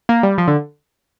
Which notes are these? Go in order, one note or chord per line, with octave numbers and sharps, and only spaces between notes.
A#3
G3
F3
D3